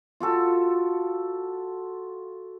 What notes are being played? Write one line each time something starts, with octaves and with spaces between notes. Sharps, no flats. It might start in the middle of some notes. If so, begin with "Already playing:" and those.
F4 F#4 A4